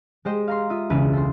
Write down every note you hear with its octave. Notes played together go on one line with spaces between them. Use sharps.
G#3 G4 C5 D#5 G5
F5 A#5 C6
F4 E5 D#6
E1 C#2 E4 B4 D#7
A4 C5 C6